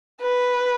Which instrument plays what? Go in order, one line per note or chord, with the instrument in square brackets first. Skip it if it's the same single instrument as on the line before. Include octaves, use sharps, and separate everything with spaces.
[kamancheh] B4